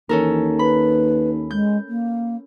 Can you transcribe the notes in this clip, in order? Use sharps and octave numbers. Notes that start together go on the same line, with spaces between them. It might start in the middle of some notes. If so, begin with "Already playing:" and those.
D#2 E3 C#4 A4 A#4
B4 B5
G#3 G6
A#3